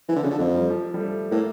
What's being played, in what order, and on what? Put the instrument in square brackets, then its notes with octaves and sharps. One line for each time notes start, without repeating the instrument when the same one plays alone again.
[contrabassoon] E3
D3
[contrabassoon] C#3 [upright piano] F3
[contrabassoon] D3
[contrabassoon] F2 [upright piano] A3
[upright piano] G3
F3
A3
G3
A3
[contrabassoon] A2 [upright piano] A#3